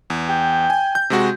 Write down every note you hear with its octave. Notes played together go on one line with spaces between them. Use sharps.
E2
G5
G#5
G6
C3 G#3 F#4